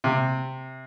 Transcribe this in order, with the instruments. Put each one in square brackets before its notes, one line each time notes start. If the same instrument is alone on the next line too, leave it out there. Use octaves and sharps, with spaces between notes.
[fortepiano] C3